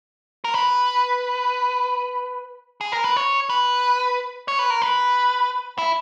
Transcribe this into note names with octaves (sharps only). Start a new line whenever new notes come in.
A#4
B4
G#4
A#4
B4
C#5
B4
C#5
B4
A#4
B4
E4